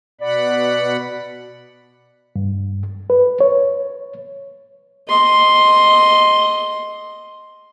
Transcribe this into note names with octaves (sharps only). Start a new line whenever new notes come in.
B2 D5 F#5 B5
G2
B4
C#5
D#5 C6